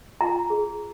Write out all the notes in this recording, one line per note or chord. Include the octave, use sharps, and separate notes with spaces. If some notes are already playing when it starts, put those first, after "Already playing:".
F4 A#5
G#4